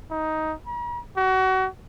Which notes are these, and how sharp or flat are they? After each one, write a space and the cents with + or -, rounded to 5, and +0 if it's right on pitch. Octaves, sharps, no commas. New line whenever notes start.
D#4 +10
A#5 +45
F#4 +30